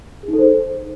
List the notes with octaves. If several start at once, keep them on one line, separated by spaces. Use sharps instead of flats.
G#4
D#4
A4
C5